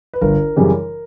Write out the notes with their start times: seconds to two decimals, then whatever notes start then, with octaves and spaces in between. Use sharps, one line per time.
0.13 B4
0.21 G1 A#4
0.56 F#2 C#3 E3 G3